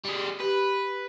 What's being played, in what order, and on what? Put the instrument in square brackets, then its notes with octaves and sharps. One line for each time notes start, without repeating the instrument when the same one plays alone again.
[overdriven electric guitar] G3 G#4
[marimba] G4 [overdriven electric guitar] B4